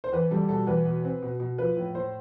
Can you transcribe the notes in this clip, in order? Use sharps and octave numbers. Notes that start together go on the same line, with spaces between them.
C5
E2 B4
G3 A4
B2 A4
E2 B4
B2
C4
B2
B2
F3 B4
A2
A2 C5